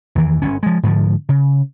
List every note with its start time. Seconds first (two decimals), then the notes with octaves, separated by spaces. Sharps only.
0.15 E2 D#3 E3
0.42 G1 C#4
0.63 F3 G#3
0.83 G#2 D3 F3
1.29 C#3